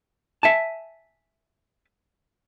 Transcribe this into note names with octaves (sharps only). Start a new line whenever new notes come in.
E5 G#5 A5